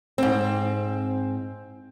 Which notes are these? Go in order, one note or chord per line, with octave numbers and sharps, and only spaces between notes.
G#2 C4